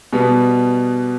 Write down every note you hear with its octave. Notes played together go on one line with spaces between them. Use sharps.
B2 G3 B3